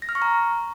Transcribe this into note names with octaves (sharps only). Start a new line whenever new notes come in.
A#6
F6
C#6
A#5